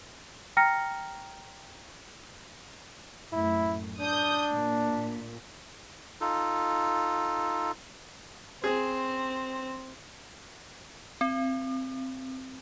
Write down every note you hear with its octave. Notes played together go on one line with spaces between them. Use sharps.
G5 A#5 F6 A#6 C#7
F#2 A2 E4
D4 D#6 G6
A#2
D#4 F4 A4
C4 G#4
C4